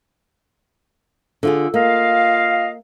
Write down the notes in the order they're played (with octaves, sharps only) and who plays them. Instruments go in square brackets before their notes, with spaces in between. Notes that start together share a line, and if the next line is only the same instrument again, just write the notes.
[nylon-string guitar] D3 F4 G#4
[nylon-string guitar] A#3 [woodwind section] F4 D#5 F5